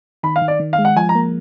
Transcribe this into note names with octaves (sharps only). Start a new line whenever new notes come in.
D#3 B5
F5
D#3
D5
D#3
F5
G#3
F#5
F3 G#5
A#5
A#3